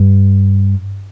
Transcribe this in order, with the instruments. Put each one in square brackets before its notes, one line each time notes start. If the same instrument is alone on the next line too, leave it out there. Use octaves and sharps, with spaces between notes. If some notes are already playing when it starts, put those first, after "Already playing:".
Already playing: [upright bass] G2